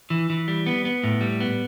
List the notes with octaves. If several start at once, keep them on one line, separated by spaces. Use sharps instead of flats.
E3
E3
G3
B3
B3
A2
G3
B3